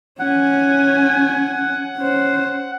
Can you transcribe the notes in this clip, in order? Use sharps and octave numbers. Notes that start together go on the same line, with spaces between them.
C#4 F#5 G#5
C#4 C5